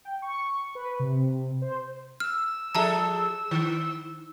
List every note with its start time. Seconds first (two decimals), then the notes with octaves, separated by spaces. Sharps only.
0.05 G5
0.22 C#6
0.75 B4
1.00 C3
1.62 C5
2.20 E6 F6
2.75 F3 G#4 A4 E5 A5 A#5
3.51 D#3